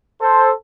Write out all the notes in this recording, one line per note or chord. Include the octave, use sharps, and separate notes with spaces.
A4 C5